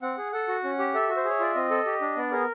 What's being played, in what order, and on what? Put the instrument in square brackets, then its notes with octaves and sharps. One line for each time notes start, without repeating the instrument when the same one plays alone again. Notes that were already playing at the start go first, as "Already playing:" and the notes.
[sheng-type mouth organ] C4 F#5
G#4
A4 F#5
F#4
C#4
G4
A4 E5
F#4
C5
G#4 C#5
F4 D5
C4 D#5
A4
G4
D4
B3 D5
G#4 A#4